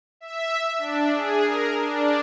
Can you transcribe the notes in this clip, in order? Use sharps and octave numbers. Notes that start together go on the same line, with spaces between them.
E5
D4
G#4
A#4
D4